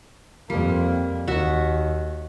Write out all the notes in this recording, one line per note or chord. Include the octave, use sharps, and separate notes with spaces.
F2 G3 A#3
D#2 F#4 E5